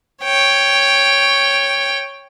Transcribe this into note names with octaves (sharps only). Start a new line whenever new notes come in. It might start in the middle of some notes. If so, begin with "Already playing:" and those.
C#5 G5